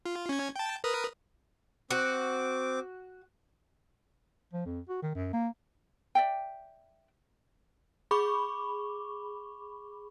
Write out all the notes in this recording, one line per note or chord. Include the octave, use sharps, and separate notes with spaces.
F4
C#4 G#6
G5 A5
A#4 B4 D#6
C4 F#4 D6
F3
F2
F#4
D#3
F#2
A#3
D5 E5 G5
G#4 B5 C#6 D6